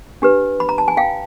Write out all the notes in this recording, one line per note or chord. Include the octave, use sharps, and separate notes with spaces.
D4 G4 B4
B5
A#5
A5
G#5
F5 G5